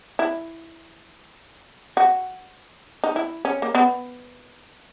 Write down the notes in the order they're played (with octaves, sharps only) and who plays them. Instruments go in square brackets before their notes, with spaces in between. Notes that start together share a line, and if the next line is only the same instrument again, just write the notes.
[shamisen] E4
F#4
D#4
E4
C#4
A#3
B3